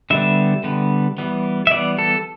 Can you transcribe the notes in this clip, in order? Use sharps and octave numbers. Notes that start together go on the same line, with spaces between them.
D3 G3 B3 E5
D3 G3 B3
E3 G3 B3
E5
E3 G3 B3 D5
A4